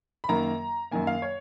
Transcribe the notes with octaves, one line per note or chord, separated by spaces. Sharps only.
B5
F#2 D#3 A#3 A#5
F#2 D#3 A#3 G#5
F5
C#5